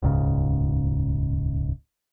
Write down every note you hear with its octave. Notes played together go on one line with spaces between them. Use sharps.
D#1 C#2 G#2 C#3